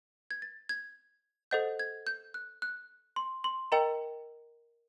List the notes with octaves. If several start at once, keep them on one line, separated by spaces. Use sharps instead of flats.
G#6
A6
G#6
A4 C5 D#5 F#5 G6
G#6
G6
F#6
F#6
C6
C6
A#4 D#5 G5 A#5